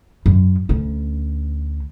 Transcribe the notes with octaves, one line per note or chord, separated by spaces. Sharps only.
F#2
D2 C#4